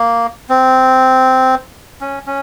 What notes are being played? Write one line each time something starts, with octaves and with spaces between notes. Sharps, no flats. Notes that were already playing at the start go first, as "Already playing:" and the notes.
Already playing: A#3
C4
C#4
C#4